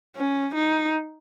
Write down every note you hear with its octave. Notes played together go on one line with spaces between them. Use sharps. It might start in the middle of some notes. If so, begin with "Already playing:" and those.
C#4
D#4